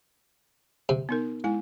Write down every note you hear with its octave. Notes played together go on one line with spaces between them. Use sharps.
C3
B3 D#4 A#4
G#3 E4 G#5